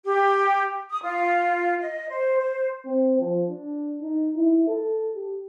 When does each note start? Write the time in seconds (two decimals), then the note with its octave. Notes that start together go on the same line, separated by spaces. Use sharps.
0.05 G4
0.90 D#6
1.02 F4
1.80 D#5
2.10 C5
2.38 C5
2.86 C4
3.20 F3
3.50 D4
4.02 D#4
4.36 E4
4.68 A4
5.15 G4